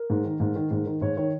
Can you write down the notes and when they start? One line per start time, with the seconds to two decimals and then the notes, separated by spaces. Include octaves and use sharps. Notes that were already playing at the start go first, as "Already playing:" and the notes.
Already playing: A#4
0.10 G#2
0.24 D#3
0.40 G#2
0.55 D#3
0.71 G#2
0.86 D#3
1.01 G#2 C#5
1.17 D#3 C#5